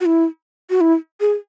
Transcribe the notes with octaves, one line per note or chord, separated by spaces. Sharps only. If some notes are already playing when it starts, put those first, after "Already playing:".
F#4
E4
F#4
E4
G#4